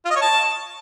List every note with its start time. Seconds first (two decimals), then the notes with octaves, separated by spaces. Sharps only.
0.05 F4
0.11 D#5
0.16 C#5
0.22 A5